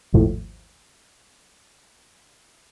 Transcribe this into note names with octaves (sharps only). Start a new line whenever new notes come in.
G#1 D#2 A2 F3